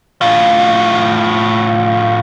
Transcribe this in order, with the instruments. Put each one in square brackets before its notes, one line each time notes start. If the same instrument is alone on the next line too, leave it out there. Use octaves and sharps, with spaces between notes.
[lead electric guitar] A2 F4